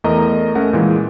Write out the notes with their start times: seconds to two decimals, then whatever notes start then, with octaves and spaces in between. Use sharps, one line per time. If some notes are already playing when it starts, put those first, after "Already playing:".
0.04 E2 A3 A#4 D#5 A#5
0.55 A3 C#4 A#4 F#5
0.73 A#2 E3 G#3